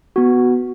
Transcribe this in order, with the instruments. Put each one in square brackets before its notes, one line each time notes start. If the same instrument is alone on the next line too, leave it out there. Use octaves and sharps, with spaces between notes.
[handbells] B3 F#4